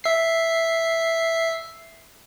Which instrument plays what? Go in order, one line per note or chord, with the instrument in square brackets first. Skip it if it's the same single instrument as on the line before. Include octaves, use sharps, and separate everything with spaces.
[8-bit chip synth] E5 C7